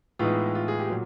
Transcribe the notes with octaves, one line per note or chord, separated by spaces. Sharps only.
A2 E3 G#3 B3 D#4 F4
F4
G#4
G4
A#2 F#3